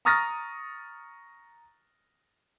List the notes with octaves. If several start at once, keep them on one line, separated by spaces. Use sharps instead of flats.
A#5 C#6 D#6 F6 A6 A#6